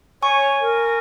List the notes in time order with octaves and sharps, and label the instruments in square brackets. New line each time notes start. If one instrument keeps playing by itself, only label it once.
[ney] C#5 [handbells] G#5 C#6
[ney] A#4